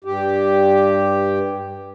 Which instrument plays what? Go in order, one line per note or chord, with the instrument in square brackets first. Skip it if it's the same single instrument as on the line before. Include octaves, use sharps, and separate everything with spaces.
[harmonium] G2 G4